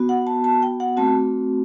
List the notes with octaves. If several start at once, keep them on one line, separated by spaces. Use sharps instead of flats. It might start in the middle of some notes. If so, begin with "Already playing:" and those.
Already playing: B3 F#4
F#5
A5
A5
G5
F#5
A3 C4 F#4 A5